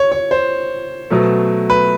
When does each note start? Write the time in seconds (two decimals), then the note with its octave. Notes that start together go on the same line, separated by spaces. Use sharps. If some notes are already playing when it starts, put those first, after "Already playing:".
Already playing: C#5
0.12 C#5
0.31 C5
1.10 B2 F#3 A3
1.70 B4